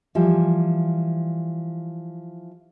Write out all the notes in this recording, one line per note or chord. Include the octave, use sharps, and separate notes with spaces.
E3 F3 G3